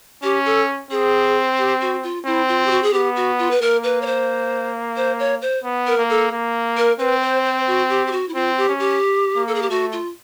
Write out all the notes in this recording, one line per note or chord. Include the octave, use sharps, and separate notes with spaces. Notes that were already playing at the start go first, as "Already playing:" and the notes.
C#4 G4
A4
C4 G#4
G4
F#4
F4
C4 E4
F4
G4
F#4
G#4
B3 G4
F#4
F4
B4
A#3 A#4
B4
C#5
C5
C5
C#5
C5
B3
A#4
A#3
A4
A#3
A#4
C4 B4
C5
C5
F#4
G4
G4
F#4
E4
C4 F4
G4
C#4
G4
A#3
A4
G#4
G4
A3 F#4
F4